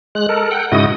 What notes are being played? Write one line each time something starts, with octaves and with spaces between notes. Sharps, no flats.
G#3 F#6
A4 A#4
F#5 G5
G#2 C#3 E4 F#4 D#5 D#6